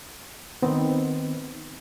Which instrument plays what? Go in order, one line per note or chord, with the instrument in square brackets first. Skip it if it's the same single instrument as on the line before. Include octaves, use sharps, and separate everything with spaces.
[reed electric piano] D#3 B3 C4 D#4